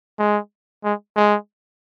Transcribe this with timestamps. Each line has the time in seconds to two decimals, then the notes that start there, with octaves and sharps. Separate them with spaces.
0.19 G#3
0.84 G#3
1.16 G#3